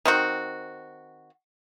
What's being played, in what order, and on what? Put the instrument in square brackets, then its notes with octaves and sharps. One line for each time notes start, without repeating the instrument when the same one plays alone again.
[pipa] D#3 C4 F#4